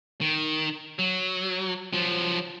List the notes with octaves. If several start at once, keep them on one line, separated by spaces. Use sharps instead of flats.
D#3
F#3
F3 F#3